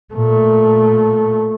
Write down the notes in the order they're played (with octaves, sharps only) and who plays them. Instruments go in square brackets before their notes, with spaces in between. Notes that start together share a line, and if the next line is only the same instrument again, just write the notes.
[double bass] A#2 A3